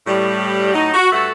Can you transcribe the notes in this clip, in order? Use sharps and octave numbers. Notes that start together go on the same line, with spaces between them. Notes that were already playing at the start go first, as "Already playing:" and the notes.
A2 G3
A2 F#3 D#4
F#4
G2 A3 F#4 A4 F#5